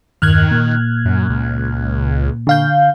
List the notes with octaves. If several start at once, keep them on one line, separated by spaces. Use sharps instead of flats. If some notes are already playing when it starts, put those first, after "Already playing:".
E2 G2 D#3 F6 F#6 G#6
A#2 A#3
F#2
C#2
D3 F5 G6